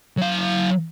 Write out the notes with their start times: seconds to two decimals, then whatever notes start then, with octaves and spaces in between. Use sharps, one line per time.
0.17 F#3 F5